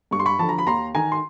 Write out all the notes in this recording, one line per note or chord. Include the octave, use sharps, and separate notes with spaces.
G2 C#6
C6
B5 C#6
D3 F3 A5
A#5
B5
D#2 A#5 C6
D#3 G#5 A#5
C6